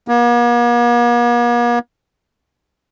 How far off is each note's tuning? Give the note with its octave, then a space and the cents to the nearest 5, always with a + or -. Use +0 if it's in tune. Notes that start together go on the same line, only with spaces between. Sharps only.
A#3 +45